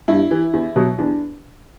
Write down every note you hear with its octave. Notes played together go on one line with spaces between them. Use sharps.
G2 E4
E3
E2
B2 F#3
E2 D4